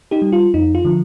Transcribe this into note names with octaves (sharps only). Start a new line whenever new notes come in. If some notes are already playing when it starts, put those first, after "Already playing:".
D#4 G4
G3
F4
F2 D#4
F4
D3 F3